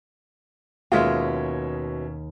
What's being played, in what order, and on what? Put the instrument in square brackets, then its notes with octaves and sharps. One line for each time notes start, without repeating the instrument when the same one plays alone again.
[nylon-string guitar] D#2 [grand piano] B2 C#4 E5 [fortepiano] G#3 F4